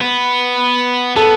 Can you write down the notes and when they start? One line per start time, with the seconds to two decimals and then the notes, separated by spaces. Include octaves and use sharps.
0.01 B3
1.16 B3 A4